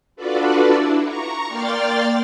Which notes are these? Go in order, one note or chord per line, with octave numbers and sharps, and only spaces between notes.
D4 F4 F#4 A4 B4 D5
D4 E4
A#5 C#6
A#3 D5 G5 C6 F6 A6